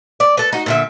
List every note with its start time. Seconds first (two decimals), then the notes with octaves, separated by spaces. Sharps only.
0.20 D5
0.37 A4 B4
0.53 D#4 F#4
0.66 A#2 D3 E5